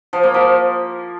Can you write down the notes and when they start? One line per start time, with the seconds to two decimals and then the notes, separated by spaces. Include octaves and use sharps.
0.13 F3
0.23 A#3
0.34 F3